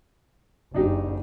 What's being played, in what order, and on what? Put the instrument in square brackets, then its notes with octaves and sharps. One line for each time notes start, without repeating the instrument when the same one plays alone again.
[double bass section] F#1 [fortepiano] D4 D#4 G4